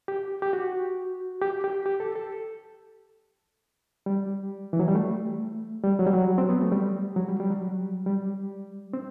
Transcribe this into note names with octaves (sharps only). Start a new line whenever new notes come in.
G4
G4
F#4
G4
G4
G4
A4
A4
G3
E3
F#3
G3
A3
G3
F#3
G3
F#3
C4
B3
A3
G3
F#3
G3
G3
F#3
G3
C4